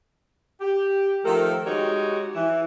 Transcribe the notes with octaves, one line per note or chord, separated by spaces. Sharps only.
G4
D#3 F3 A3 A4 A#4
G#3 D#4 F#4 G4 C#5
E3